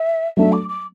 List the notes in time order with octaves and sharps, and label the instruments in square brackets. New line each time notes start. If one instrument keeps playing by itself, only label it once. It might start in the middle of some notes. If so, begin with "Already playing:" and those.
Already playing: [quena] E5
[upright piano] F#3 A3 D4 [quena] E5
[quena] D6
D6